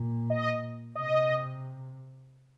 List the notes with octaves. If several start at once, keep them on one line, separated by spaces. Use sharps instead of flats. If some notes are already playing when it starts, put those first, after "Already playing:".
Already playing: A#2
D#5
C3 D#5